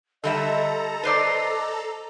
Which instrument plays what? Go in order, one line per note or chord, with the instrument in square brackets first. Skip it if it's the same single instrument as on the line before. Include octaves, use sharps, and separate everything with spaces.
[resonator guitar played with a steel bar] D3 G3 E5 [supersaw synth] A4 A#5 [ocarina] D#5
[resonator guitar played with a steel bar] B4 C5 D5